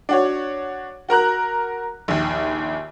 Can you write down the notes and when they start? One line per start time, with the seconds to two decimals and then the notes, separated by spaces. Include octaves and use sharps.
0.09 D4 F#4 C#5
1.09 F#4 A#4 A#5 F#6
2.08 A#1 D#2